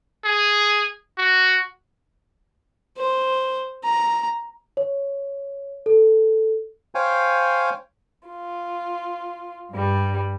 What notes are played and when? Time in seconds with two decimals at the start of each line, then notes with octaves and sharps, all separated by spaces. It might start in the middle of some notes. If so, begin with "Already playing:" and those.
0.24 G#4
1.18 F#4
2.98 C5
3.84 A#5
4.77 C#5
5.86 A4
6.95 C5 C#5 F5 G5 G#5
8.27 F4
9.70 G2 G3